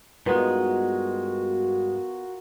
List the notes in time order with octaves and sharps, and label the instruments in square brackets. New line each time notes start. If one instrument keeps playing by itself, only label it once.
[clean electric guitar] G2 G#3 [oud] B3 D#4 [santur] F4 A#4 F#5 [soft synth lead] F#4